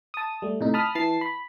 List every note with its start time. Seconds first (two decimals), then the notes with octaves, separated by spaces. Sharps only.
0.14 A5 D#6
0.42 G3 A3
0.61 A2 C3 D#4
0.74 A5 B5 D#6 F6
0.95 E3 A5 A6 C7
1.21 B5